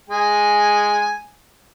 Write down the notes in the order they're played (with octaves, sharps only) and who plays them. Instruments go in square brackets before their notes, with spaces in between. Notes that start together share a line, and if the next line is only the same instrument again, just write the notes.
[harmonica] G#3 G#5